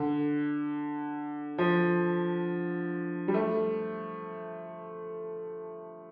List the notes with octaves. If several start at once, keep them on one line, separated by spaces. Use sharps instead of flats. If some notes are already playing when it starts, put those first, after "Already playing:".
Already playing: D3
F3
G3
A3